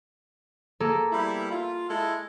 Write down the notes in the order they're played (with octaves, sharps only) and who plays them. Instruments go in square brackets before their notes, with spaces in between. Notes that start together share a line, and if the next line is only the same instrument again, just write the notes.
[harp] A#3 G#4 A4
[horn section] G3 B3 E4
F4
G#3 E4 A4